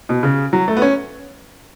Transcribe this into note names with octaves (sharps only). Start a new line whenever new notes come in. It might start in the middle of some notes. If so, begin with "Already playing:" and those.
B2
C#3
F#3
A3
B3
C#4